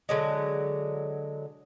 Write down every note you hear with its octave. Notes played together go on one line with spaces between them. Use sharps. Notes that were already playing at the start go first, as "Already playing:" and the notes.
D3 F#3 G#3